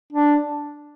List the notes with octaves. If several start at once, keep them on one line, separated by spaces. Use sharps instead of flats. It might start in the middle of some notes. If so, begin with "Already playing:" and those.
D4